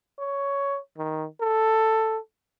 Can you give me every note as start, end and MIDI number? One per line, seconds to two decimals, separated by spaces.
0.19 0.78 73
0.98 1.26 51
1.41 2.18 69